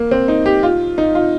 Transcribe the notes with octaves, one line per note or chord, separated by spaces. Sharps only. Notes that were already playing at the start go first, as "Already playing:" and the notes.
Already playing: A#3
C4
D#4
G4
F4
D#4
F4